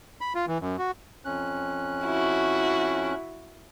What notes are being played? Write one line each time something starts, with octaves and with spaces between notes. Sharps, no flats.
B5
F4
E3
F#2
F#4
F2 C#4 F#6
E4 F#4